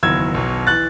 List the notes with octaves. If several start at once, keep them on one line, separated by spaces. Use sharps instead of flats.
F#1 E2 D#3 F#3 E6 G#6
B1 B2 F#3
E3 F#6 A6